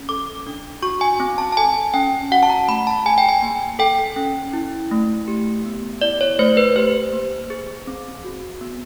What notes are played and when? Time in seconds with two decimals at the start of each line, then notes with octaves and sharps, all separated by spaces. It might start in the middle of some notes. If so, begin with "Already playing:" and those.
Already playing: C#4
0.09 A4 D6
0.47 D4
0.82 F#4 C#6
1.01 G#5
1.20 C4
1.38 A5
1.52 A5
1.57 A4 G#5
1.94 C#4 G5
2.31 F#4 F#5
2.43 A5
2.50 A#5
2.68 A3 B5
2.87 A5
3.06 G#4 G#5
3.18 G5
3.29 G#5
3.42 A#3
3.79 A4 G5
4.16 C#4
4.53 E4
4.91 A3
5.28 G4
5.66 B3
6.01 E4 D5
6.21 C#5
6.39 A3 C5
6.57 B4
6.76 G4 C5
7.13 A#3
7.50 G#4
7.87 C4
8.24 F#4
8.61 B3